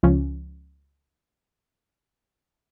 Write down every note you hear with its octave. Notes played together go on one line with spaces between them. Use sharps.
C#2 F3 C#4